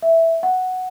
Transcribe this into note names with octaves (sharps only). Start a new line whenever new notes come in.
E5
F#5